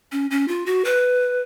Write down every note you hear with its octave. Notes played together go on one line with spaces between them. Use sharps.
C#4
C#4
F4
F#4
B4